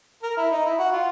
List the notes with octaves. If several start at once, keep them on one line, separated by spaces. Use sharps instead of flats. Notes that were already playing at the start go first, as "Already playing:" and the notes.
A#4
E4
D#4
E4
F#4
F4